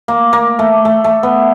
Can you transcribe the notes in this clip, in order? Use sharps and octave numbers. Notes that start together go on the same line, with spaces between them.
A#3
A#3
A3
A3
A3
B3